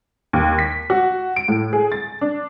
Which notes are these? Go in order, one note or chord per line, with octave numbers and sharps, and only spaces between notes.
D#2
B6
F#4
D7
A2
G#4
A6
D4